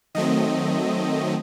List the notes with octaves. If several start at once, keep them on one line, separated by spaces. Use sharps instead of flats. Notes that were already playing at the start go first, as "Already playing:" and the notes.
D#3 F#3 A3 C4 D#5